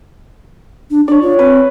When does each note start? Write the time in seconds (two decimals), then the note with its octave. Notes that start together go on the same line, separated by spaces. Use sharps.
0.90 D4
1.08 D4 C#5 D5
1.22 F4
1.39 C4 B4